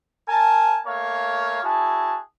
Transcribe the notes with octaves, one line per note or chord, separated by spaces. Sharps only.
A#4 G#5 A5
A3 A#3 C#5 F5
E4 F#4 G#4 A5